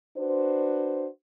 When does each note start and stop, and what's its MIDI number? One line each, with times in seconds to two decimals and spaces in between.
0.17 1.07 62
0.17 1.07 66
0.17 1.07 71
0.17 1.07 72